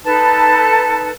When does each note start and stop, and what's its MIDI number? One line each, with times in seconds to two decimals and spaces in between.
0.04 1.11 63
0.04 1.11 69
0.04 1.11 71
0.04 1.11 81